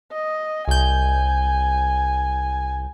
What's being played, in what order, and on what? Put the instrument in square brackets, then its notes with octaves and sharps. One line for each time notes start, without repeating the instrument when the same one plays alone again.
[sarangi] D#5
[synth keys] C2 G6 [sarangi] G#5